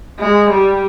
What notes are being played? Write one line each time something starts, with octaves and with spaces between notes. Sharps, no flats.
G#3
G3